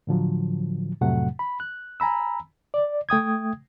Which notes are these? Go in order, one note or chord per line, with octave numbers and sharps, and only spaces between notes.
A2 D3 F3 F#3
F2 A2 C3 F#3 A3 F#5
B5
F#6
G#5 A#5 B5 E6
D5
A3 G5 D#6 G#6